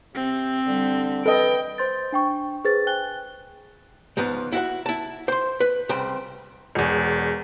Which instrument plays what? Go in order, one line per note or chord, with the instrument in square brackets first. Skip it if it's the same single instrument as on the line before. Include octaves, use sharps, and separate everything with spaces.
[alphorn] C3 [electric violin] C4
[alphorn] D3 [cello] G3
[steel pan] A4 D#5 [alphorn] B4 [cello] G5
[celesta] C5 C6 G6 A6
D4 G5 C#6
G#4 B4 C5 A6
G5 G#5 F#6 G7
[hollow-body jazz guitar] C#2 G#2 F3 B3
E4 F#4 F#5
E4 A5
C5 C6
B4
C2 C#3 C5 G5 B5
[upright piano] E1 E2